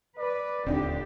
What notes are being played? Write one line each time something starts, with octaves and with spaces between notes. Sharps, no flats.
B4 D5
D#1 D2 D3 C4 D4 D#4 G4